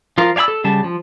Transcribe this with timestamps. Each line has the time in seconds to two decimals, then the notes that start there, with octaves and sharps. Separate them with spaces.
0.18 F3 F4 A#4
0.36 D5 F5 G#5 B5 E6
0.48 A4
0.64 C#3 G3 A5
0.84 F3